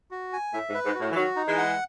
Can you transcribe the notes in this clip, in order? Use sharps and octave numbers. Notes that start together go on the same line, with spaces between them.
F#4
G#5
A2 E5
G#2
B4
G#2
F#4
A2
E3
D#3 F#3 F#4
D#4
E3 G#3
F#5